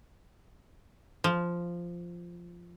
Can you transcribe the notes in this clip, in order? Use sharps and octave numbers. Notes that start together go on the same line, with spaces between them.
F3